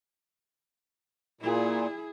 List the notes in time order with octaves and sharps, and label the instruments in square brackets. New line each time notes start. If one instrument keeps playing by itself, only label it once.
[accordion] A#2 [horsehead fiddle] E4 G#4